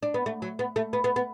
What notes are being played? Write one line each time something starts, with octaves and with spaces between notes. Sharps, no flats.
D4
B3
A3
F#3
B3
A3
B3
B3
B3